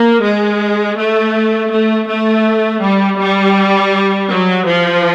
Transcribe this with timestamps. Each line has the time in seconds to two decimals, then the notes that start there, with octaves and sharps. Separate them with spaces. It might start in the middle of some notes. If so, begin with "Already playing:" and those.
Already playing: A#3
0.23 G#3
0.98 A3
1.72 A3
2.08 A3
2.83 G3
3.20 G3
4.31 F#3
4.68 F3